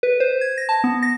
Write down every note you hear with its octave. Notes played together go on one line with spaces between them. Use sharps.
B4
C5
G#6
A#6
A5
B3
A#6